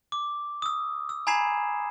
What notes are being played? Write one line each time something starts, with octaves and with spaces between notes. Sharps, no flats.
D6
D#6 E6
E6
G#5 A#5 B5 G#6 C7 E7